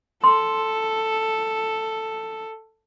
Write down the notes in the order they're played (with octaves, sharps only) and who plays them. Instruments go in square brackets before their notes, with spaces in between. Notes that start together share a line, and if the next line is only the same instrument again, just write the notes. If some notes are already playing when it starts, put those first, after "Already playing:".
[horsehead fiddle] A4 [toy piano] C6